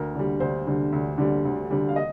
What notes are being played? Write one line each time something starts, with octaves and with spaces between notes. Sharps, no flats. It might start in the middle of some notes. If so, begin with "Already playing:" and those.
Already playing: D2 A#4
D3 G3
D2 C5
D3 G3
D2
D3 G3
D2
D3 G3
F5
D#5